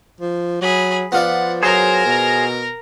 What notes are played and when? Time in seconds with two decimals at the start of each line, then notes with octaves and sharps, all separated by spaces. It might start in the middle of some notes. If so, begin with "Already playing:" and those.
0.20 F3
0.61 F#3 G#4 B5
1.12 F3 B3 F4 D5 F#5
1.63 F#3 G#4 A#4 C5 A#5
2.06 B2